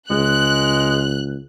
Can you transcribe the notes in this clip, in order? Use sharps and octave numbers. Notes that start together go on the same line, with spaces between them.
C#2 G#3 F#6